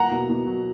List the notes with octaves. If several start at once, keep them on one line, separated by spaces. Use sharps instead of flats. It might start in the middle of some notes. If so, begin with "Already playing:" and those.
Already playing: A#3 F#5 A#5
B2
B2
F#3